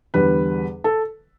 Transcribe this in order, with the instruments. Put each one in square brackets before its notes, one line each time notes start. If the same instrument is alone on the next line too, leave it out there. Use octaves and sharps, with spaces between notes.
[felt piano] E2 D3 G3 B4
A4